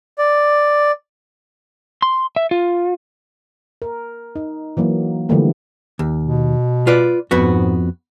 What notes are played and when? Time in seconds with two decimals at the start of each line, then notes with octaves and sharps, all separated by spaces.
0.18 D5
2.02 C6
2.36 E5
2.51 F4
3.82 A#4
4.36 D#4
4.77 E3 F#3 A#3
5.29 D3 E3 F3 G3 A3 A#3
5.99 D#2
6.24 B2
6.87 F4 B4 D5
7.31 F2 G#2 B3 F#4